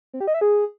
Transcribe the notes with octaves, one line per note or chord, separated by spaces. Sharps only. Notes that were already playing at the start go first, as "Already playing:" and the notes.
C4
G4
D#5
E5
G#4